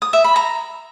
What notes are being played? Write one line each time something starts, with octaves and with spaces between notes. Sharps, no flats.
D#6
E5
B5
A#5